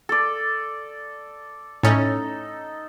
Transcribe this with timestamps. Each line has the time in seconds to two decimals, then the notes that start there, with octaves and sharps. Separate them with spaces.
0.09 A4 D5
1.83 A2 C#4 D#4 A4